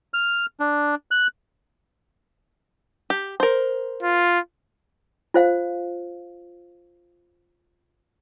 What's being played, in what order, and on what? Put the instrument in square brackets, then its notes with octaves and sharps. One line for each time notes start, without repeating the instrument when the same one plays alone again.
[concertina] F6
D4
F#6
[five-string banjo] G4
A#4 C5
[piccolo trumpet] F4
[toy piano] F4 C5 F5